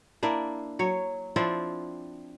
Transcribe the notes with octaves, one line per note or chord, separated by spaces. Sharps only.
A#3 D4 E4
F#3 C#5
F3 C4 D4 E4